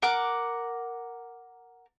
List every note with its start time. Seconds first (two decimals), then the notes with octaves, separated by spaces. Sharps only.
0.02 A#4 F#5 D6